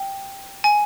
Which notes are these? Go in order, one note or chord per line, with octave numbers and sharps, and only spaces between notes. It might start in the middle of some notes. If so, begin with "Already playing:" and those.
Already playing: G5
G#5